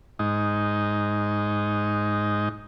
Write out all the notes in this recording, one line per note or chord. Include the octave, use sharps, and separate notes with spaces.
G#2 D#4